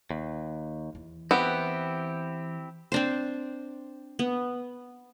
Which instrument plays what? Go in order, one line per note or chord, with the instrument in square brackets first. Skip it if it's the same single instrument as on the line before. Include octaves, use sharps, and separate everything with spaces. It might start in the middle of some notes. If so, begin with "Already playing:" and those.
[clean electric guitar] D#2
[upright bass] E2 E3
[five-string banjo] B3 [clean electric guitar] C4 E4 G4
[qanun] C4 D4 C5
B3